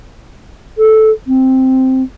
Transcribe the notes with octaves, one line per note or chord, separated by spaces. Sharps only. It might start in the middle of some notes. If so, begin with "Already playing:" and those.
A4
C4